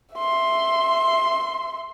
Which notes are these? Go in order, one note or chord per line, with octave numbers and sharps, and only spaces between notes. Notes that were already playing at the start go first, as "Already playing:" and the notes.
E5 C6